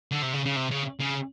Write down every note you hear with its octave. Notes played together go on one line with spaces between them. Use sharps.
D3
C3
C#3
C#3
C3
C#3
C#3